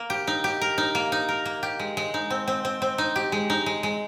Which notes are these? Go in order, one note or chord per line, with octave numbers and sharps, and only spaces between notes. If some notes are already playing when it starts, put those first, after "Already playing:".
Already playing: A#3 A#4
G4
D#4
G4
A#4
D#4
A#3
D#4
A#4
A#3
G4
G#3
G#3
D#4
C4
C4
C4
C4
D#4
G4
G#3
D#4
G#3
G#3